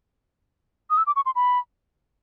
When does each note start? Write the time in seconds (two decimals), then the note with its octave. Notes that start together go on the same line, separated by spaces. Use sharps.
0.90 D#6
0.98 E6
1.07 D6
1.16 C#6
1.26 C6
1.35 B5